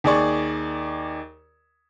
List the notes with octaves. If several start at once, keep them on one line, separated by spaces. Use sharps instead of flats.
D#2 G#4 D5 C#6